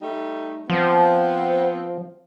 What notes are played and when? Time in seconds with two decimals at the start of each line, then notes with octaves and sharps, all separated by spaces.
0.02 G3 A3 D#4
0.70 F3 B3 C4